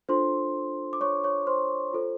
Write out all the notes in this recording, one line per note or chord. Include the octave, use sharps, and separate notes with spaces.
D4 F4 A4 C5 C6
D6
C#5 C#6
C#5 C#6
C5 C6
F4 A4 C5